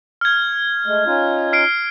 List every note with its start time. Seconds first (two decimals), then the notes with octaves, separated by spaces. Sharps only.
0.21 F6 G#6
0.86 G#3 A3
1.06 C#4 D#4 F4
1.53 F6 C7 D7